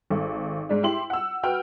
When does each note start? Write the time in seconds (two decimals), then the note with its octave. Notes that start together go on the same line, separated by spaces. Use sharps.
0.10 G#1 A4
0.69 G#2 G#3 D4
0.83 E4 G4 C6 F#7
1.10 F#5 E6
1.43 F#4 B4 G5 F6